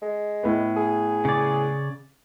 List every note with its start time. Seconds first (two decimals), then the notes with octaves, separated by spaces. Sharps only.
0.02 G#3
0.43 A2 B3
0.77 G#4
1.25 C#3 D5